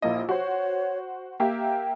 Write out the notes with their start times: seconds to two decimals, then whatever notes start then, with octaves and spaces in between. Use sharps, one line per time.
0.02 A#1 A#3 E4 D#5
0.29 F#4 C5 C#5
1.40 A#3 G4 E5 G5